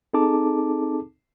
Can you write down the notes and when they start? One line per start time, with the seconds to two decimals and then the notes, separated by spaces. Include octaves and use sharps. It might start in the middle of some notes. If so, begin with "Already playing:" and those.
0.13 C4 D#4 G#4 A4 A5 D6